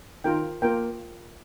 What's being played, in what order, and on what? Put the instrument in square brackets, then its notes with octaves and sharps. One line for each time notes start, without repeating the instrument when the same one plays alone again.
[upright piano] D#3 [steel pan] F4 A#4 G5
[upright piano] A#3 [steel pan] F4 A#4 G5